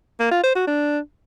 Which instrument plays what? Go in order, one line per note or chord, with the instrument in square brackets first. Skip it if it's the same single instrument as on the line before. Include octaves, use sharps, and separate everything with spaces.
[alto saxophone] A#3
F4
C5
F#4
D4